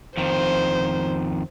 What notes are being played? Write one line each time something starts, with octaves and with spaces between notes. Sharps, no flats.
F2 D#3 C5